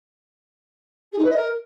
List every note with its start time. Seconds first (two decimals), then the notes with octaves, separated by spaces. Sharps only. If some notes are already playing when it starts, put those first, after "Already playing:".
1.12 G#4
1.18 D#4
1.24 B4
1.30 D#5
1.36 A#4